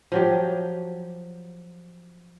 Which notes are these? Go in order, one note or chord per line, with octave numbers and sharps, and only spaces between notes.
F3 F#3 G4